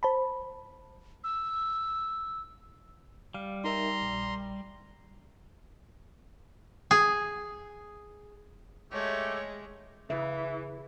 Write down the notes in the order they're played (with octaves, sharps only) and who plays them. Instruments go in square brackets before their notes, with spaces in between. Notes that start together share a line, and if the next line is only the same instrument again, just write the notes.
[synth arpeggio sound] C5 A5 B5
[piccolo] E6
[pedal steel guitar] G3 [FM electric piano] F5
[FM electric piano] D#4 A#4 E5 [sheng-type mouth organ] A#5 C6
[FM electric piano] A#1
[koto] G#4
[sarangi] G#3 [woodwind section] A3 G4 [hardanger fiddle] C#5
[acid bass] C#3 [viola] E3 [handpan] E5